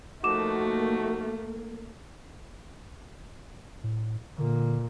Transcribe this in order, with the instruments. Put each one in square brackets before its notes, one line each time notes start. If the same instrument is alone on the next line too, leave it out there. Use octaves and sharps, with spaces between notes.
[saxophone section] F3 D#4 F#4 [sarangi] A3 [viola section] A#3 [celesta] D6 E7
[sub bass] A2
[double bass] A#2 [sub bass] D3